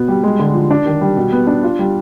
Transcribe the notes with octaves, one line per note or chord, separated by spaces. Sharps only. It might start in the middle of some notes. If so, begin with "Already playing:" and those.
Already playing: B2 B3
G3
G#3
D3
F3
D4
D#3
G3
B2
B3
D4
F4
G3